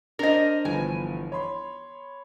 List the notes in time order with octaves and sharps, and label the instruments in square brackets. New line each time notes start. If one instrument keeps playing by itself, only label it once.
[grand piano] D4 C5 [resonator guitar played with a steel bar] A#4 D#5
[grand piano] G1 E3 F3 [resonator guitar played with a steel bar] G#5
[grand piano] C#5 B5 C6